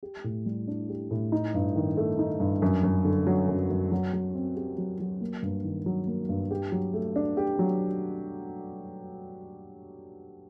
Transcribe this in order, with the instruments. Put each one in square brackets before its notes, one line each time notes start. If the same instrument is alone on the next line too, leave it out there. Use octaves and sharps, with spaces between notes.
[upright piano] G4
A2
G3
D4
G4
A2
D#4
G2
D#3
A3
D#4
G2
F#2
F#2
D3
F#3
F#2
F#2
F#3
F#3
C4
G4
F#3
F#3
A#3
G2
D#3
F#3
A#3
G2
G4
F#3
A3
D4
G4
F#3